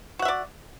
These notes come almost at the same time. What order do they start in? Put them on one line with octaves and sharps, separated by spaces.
F#4 F#5 E5 D5